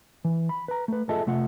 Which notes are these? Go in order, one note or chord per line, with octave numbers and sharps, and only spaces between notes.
E3
B5
B4 A#5
A3 B4
F4 G#4 A4 D#5 E5 A5
C3 A3 F4 F#5